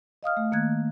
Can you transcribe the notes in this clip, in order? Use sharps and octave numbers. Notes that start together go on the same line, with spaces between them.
D#5 F5 D#6 F6
A3
D#3 A#3 F#6 G#6